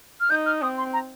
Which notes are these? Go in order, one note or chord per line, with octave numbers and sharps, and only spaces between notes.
F6
D#4 G6
F6
C4 D#6
C6
A#5